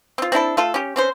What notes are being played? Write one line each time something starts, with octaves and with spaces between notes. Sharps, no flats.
C4 F4
C4 D4 E4 A4
A3 F4 A4
C#4 G4
C4 C#4 C5